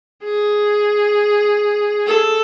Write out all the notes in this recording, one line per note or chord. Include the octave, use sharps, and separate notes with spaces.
G#4
A4